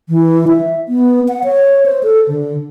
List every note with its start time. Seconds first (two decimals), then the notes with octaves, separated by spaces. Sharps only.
0.09 E3
0.48 E5
0.88 B3
1.28 F#5
1.44 C#5
1.86 C5
2.03 A4
2.28 D3